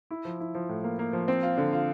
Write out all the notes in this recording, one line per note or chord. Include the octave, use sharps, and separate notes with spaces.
E4
F3
E4
F3
A2
A#3
A#3
F3
C4
F4
D3
F4